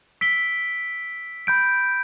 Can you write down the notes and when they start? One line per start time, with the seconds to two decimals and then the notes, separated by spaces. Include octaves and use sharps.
0.21 E6 B6 D7 G7
1.47 B5 G6 D7